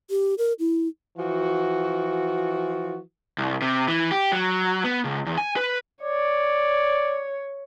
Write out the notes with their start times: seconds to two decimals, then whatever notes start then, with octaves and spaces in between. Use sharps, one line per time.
0.10 G4
0.38 A#4
0.59 E4
1.16 E3 F3 F#4
3.38 C2
3.62 C3
3.88 E3
4.12 G4
4.32 F#3
4.84 B3
5.05 C#2
5.26 E2
5.38 G#5
5.56 B4
6.03 C#5 D5